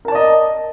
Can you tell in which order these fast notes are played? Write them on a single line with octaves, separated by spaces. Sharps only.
A#4 A5 D5 D#5